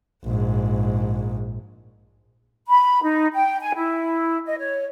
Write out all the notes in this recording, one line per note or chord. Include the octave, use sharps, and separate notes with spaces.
A#1 G#2
B5
D#4
G5
G#5
E4
D#5
C#5